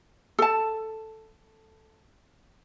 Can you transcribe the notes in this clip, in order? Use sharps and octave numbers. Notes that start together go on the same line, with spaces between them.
A4 A5